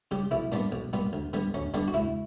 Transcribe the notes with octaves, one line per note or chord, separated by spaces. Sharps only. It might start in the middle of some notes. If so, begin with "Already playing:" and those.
C#3 G3 G4
B1 E4
A#2 G3 B3 D4
B1
A#2 G3 B3
D2
D3 G3 B3
D2 C#4
D3 G3 B3 D4
F#4
C#2 E4